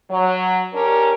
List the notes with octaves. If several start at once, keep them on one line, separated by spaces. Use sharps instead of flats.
F#3
C#4 D4 G4 A#4